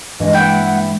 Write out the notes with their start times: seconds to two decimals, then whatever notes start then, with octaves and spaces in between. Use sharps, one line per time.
0.20 G2 E3 G#3 A#3 D#5
0.33 E4 F#5 G5